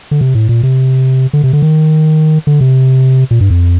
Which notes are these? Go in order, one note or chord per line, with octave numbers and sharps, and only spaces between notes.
D3
C3
A2
A#2
C3
D3
C3
D3
D#3
D3
C3
A#2
G2
F2